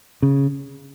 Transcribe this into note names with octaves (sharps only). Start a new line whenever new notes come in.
C#3